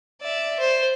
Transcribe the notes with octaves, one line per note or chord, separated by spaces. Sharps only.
D5 E5
C5